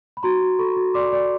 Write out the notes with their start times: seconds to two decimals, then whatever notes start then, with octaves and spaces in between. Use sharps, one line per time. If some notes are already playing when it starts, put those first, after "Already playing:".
0.17 B5
0.23 F#4 A#5 C6
0.42 F#4
0.59 A4 B5 C#6
0.77 F#4
0.94 D5 C6 D6
1.13 D5